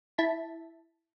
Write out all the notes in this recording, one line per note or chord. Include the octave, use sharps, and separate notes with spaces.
E4 A5 B6